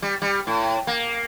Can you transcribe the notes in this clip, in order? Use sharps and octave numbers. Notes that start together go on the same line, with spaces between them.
G3
G3
A2
A#3